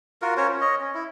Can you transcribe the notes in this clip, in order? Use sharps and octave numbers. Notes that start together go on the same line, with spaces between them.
F4 F#4 A#4
C#4 A#4 C5 C#5
C#4
C#5 D#5
C#4
E4